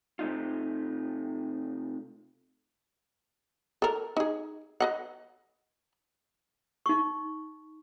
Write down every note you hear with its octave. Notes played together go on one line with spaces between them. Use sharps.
C3 A3 D#4 F4
A4 A#4
D#4 G#4
B4 D#5 F#5
D#4 C#6